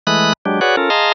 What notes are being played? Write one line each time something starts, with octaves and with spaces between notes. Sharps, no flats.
E3 G#3 A3 B5 D#6 F#6
F#3 G#3 D4 G4
F#4 G#4 B4 C#5 D5 F#5
C#4 F4 A4 A#4
G#4 D#5 F5 A5 A#5 C6